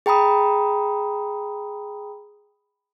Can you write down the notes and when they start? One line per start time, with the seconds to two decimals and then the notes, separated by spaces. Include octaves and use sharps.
0.06 G#4 G5 A#5 B5 D#6